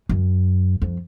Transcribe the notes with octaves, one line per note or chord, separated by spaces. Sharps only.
F#2
F2